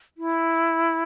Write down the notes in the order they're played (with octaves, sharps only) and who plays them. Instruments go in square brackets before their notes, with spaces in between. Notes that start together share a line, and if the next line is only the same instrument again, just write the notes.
[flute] E4